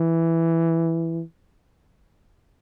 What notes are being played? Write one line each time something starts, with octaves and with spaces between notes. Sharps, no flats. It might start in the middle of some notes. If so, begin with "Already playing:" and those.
Already playing: E3